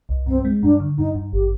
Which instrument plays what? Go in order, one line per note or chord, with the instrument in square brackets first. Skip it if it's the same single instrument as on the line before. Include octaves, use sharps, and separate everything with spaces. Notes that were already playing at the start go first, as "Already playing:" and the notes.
[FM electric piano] C2
[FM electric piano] G2 [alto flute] C4
[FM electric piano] G#3
[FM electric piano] G2 [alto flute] D4
[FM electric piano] D3
[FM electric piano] G2 [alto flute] D#4
[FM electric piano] G2
[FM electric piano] G#1 [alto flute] G4